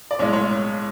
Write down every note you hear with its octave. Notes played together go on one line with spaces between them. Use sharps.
D5
B1 A2 G#3 C#5
C#5